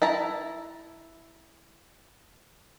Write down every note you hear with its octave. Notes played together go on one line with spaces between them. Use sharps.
E4 A5 A#5